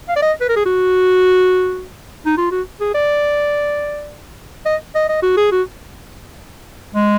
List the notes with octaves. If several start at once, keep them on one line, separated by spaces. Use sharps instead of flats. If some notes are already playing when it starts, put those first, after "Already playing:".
F5
D5
D#5
B4
A#4
G#4
F#4
D#4
F4
F#4
G#4
D5
D#5
D#5
D#5
F#4
G#4
F#4
G#3